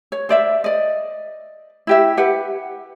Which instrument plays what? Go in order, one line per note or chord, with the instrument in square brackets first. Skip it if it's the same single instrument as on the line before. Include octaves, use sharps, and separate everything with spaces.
[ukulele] C#5
C5 D5 E5
D5 D#5
E4 G4 E5
G4 B4 F#5